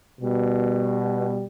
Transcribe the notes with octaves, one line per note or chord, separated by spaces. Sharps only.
B2 G3